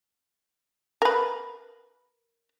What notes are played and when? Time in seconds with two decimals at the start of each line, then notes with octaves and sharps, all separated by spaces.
1.02 A#4 B4